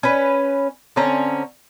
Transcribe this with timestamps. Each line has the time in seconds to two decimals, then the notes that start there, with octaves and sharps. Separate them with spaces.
0.03 C#4 B4
0.96 D3 C4 C#4 A#5